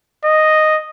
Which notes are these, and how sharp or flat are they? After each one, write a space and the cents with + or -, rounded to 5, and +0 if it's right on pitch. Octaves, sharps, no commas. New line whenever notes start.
D#5 -5